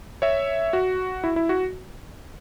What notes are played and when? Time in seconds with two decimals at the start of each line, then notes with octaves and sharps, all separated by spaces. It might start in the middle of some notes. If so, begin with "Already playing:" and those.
0.22 C#5 E5
0.73 F#4
1.24 E4
1.36 E4
1.49 F#4